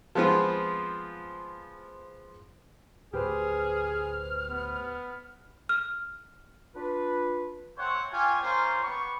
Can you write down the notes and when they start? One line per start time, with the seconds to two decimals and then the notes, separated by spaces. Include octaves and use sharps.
0.15 F3 G#3 B3 C4 F4
3.13 D2 A2 G4 G#4 B4 C5 F6
4.50 B3
5.69 F6
6.75 D4 F4 B4
7.77 A3 C4 C5 C#5 F#5
8.11 F4 G4 C#5 G#5
8.41 A#3 C#4 F4 A#4 C5
8.83 B3 G4 C#6